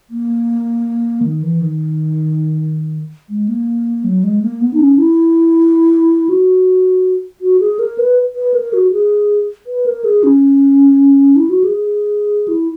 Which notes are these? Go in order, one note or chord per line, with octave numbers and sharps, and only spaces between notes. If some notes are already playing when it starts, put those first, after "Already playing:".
A#3
D#3
E3
D#3
G#3
A#3
F#3
G#3
A#3
B3
D#4
C#4
E4
F#4
F#4
G#4
A#4
B4
B4
A#4
F#4
G#4
B4
A#4
G#4
C#4
E4
F#4
G#4
G#4
E4